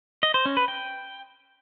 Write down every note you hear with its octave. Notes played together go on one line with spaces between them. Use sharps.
D#5
C5
C#4
B4
G5